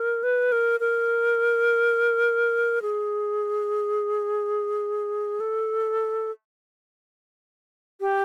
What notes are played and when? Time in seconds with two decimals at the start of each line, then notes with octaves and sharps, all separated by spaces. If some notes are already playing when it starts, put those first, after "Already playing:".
Already playing: A#4
0.23 B4
0.52 A#4
0.80 A#4
2.82 G#4
5.40 A4
8.00 G4